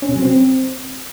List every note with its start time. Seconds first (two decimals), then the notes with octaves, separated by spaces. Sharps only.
0.02 C#4
0.09 C3
0.15 F#3
0.22 C4